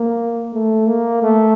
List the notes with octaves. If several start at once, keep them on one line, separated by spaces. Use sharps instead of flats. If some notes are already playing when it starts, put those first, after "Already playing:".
Already playing: A#3
A3
A#3
A3